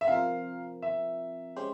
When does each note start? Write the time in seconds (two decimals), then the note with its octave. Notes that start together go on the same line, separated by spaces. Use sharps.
0.01 E5
0.08 C3 F3 C4 F4 A#4 F5
0.82 E5
1.56 G#3 C#4 G4 C5